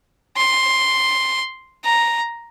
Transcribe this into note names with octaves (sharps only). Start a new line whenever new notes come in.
C6
A#5